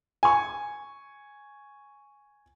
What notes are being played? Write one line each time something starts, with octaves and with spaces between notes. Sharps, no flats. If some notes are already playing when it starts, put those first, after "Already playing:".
G#5 C#6